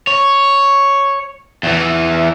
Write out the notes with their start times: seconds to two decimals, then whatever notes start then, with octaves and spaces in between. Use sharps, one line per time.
0.07 C#5
1.63 E2 E3